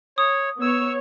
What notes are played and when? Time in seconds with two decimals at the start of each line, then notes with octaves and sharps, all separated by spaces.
0.18 C#5 D#6
0.61 B3 C#5 E6